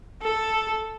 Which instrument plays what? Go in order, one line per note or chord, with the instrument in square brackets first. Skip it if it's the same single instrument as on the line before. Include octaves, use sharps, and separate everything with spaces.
[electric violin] A4